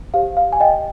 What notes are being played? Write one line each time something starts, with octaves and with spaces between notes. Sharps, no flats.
G4 C5 F5
F5
G#5
D#5 G5